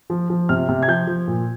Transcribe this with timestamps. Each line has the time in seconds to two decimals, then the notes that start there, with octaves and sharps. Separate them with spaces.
0.10 F3
0.30 F3
0.49 C3 F6
0.69 C3
0.83 G#6
0.88 F3 G6
1.07 F3
1.27 A#2